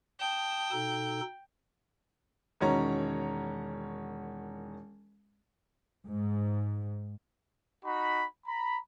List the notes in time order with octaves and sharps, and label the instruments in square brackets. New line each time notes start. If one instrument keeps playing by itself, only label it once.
[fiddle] G5 [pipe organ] A5 D#6
[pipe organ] B2 D#4 A4
[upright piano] E1 D#3 C#4 F#4 C#5 A#5
[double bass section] G#2
[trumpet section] D#4 F#4 B5
A#5 B5